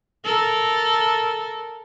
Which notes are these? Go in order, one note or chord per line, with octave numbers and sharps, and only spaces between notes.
A4 A#4